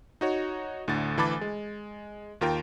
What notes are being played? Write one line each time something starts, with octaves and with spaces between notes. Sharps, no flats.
D#4 F#4 C#5
D2 A2 D3 A6
D2 E3 A5 B5 D6 A6
G#3
D#2 F4 A#4 G5